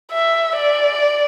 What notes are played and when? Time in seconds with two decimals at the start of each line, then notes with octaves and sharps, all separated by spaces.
0.12 E5
0.56 D5